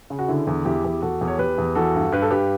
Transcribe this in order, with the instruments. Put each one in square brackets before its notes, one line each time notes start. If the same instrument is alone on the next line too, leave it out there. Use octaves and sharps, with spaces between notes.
[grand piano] C#3
F#4
D3 E4
E2
E2 E4 G4
E2
E2 F#4 A4
E2
C#5
E2 G4 B4
E2
E3 F#4 A4
G2
G2 B4
A4
G2 G4 B4